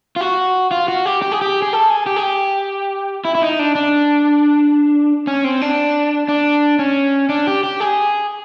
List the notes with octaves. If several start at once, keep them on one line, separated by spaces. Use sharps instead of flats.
F4
F#4
F4
F#4
G4
G4
G#4
G4
G#4
A4
G#4
G4
G#4
G4
E4
E4
D#4
D4
D4
C#4
C4
D4
D4
C#4
D4
G4
G4
G#4